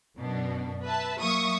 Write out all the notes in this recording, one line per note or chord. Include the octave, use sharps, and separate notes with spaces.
F#2 B2 D4
B4 E5 A5
F#3 A#3 E5 C#6 D#6